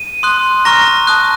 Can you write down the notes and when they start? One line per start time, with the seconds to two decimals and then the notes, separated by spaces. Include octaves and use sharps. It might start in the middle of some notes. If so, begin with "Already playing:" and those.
Already playing: D#7
0.23 C6 D#6 F#6
0.65 A#5 C#6 F6 A#6
1.07 A5 D#6 F#6